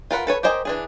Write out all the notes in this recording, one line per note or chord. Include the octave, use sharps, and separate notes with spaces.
F4 A#4 B4 F#5
A4 B4 C#5
G4 A#4 C5 D#5 G#5
E3 D4 G#4